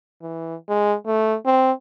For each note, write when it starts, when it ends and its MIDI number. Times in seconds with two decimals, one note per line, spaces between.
0.22 0.55 52
0.69 0.95 56
1.07 1.36 57
1.46 1.72 60